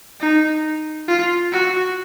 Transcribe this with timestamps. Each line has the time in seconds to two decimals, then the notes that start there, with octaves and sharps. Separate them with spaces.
0.20 D#4
1.08 F4
1.52 F#4